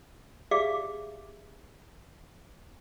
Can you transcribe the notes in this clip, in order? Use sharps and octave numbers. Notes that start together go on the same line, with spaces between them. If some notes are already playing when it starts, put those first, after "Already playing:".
G4 G#4 D5 E5 F5 D6